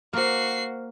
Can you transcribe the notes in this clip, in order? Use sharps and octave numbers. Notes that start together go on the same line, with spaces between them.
A#3 F#4 C5 F6 C7